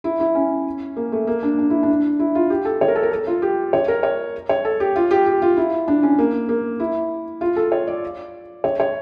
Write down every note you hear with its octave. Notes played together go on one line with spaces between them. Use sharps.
E4
E4
C#4
A#3
A3
A#3
D4
D4
E4
D4
E4
F4
G4
A4
C#5
A#4
A4
A#4
A4
F4
G4
C#5
A#4
C#5
C#5
A4
G4
F4
G4
G4
F4
E4
D4
C#4
A#3
A#3
E4
F4
A4
C#5
D5
C#5
C#5